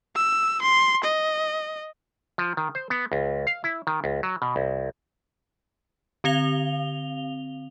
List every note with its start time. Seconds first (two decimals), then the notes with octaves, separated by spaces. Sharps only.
0.16 E6
0.62 C6
1.04 D#5
2.38 F3
2.57 D#3
2.75 C5
2.90 B3
3.12 C#2
3.47 F5
3.64 E4
3.87 D#3
4.04 C#2
4.23 F#3
4.42 B2
4.56 C2
6.24 D3 C4 F5 F7 G7